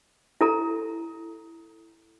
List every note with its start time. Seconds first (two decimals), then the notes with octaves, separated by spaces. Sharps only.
0.41 E4 A4 A#5